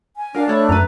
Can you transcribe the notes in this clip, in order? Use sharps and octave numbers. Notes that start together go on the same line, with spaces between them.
G#5
D4 A#4 F5
A3 A4 C#5 B5
F#2 B4 A#5